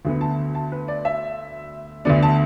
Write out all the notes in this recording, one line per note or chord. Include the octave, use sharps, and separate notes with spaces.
D2 D3 B3
A5
A5
B4
D5
E5
D2 D3 B3 D5
A5